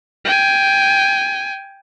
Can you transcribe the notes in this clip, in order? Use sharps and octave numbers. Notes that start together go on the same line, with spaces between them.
G5 G#5